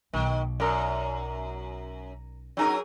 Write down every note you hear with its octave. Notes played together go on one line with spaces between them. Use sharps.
B1 D#3
F#2 A#4 D5
F#3 C#4 D#4 G#4 A#4